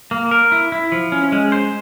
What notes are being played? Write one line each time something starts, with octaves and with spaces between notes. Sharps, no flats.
A#3
A#4
E4
E4
F3
C#4
G#3
C5